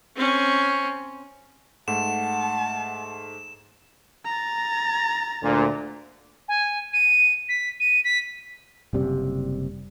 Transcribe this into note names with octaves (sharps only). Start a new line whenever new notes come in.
C4 C#4
G#2 A3 F#5 A5 E7
A#5 A6
D2 A#2 D3
G#5
D#7
B6
D#7
B6
F#1 C3 G3